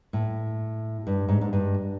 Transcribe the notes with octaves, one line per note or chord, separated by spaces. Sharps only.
A2
G2
G#2
G#2
G2